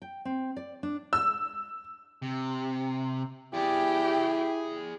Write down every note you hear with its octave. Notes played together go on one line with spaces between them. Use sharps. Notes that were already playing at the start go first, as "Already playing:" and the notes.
G5
C4
D5
D4
E6
C3
E4 G4 G#4 D5 G5